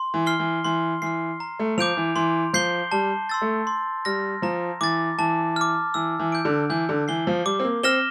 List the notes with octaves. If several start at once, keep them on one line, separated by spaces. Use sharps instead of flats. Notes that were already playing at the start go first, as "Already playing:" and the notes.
Already playing: C6
E3
F6 C7 G7
E3
E3 C6
E3 F6 C7
A#5
A3
F3 D6 G6 D7 F7
E3
E3 C6
F3 G6 C7 G7
G3 A5
C6 E6 A6
A3
C6
G3 F6 A#6
F3 A#5
E3 D6 A6
E3 A5
D6 F6
E3 E6
E3
G6 D7
D3
E3 G6
D3
E3 C7 G7
F3
G3 D6
C4
A#3
C4 F6 A#6 E7 G7